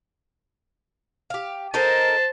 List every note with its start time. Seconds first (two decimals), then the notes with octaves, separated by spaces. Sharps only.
1.30 G4 F5
1.74 D#4 A4 A#4 C5 A5